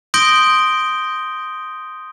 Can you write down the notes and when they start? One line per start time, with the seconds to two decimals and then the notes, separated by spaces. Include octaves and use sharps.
0.14 C6 D#6 G6 A#6 D7 G7